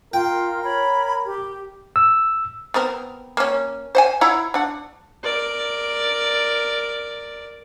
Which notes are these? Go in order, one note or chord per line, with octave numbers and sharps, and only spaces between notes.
F4 A#4 G5
C#5 B5
G4
E6
B3 C4 A#4
A#3 C#4
C5 F#5 G#5
E4 F#5 A#5
D4 F#5
A#4 D5